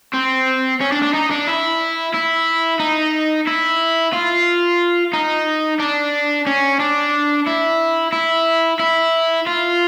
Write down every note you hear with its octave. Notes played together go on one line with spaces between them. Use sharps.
C4
C#4
D4
D4
D#4
D4
E4
E4
D#4
E4
F4
D#4
D4
C#4
D4
E4
E4
E4
F4